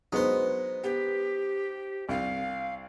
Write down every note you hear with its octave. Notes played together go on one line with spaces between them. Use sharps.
F#3 G#3 B3 D#4 C5
B3 G4
C2 F5